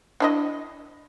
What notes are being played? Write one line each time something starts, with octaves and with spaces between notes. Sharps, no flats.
D4 E4 D#5